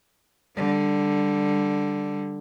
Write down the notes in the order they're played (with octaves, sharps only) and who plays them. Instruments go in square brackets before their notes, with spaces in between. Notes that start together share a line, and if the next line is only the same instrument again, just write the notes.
[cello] D3 G3